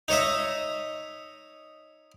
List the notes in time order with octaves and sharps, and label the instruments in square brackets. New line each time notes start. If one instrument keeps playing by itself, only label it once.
[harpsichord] D#4 C#5 D#5 E5